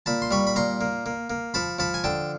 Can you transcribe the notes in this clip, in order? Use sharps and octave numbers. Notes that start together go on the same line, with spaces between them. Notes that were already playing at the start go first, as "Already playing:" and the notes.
A#2 A5 B5
C6
G3 B5 C#6
B5
A#2 A#5 C6
A#3
A#3
A#3
F3 A5 B5
F3 A5 B5
G#5
D3 G5 A5